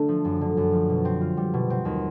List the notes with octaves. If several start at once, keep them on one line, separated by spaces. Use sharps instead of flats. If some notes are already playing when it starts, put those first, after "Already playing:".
Already playing: D3 A3 D4
F3
F#2
D3
F#2
F3
B2
C4
F4
G3
B2
C4
D#2